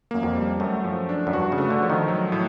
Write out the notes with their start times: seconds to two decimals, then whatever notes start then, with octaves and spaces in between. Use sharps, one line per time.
0.11 F#2 A#3
0.23 F2
0.36 G3
0.60 F#2 A3
0.84 F3
1.09 D4
1.27 F#2
1.33 G2 F#4
1.52 C#3
1.58 A3
1.70 D3
1.82 F3
1.90 D#3
2.08 F#3
2.32 A2